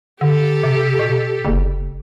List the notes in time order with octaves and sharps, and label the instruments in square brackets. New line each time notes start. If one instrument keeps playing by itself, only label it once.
[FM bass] D3 [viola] G4 A4
[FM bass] C3
B2
F#1